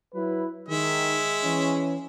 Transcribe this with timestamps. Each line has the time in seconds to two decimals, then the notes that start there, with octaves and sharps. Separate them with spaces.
0.13 F#3 E4 B4
0.68 D#3 G#3 E5
1.43 E3 C#4